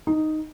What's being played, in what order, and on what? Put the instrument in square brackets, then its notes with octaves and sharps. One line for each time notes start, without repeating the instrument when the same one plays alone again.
[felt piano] D#4